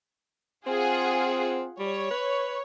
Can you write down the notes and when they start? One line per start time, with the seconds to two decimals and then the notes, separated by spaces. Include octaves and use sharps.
0.67 C4 F4 G#4 F#5
1.79 G3 C#5
2.10 B4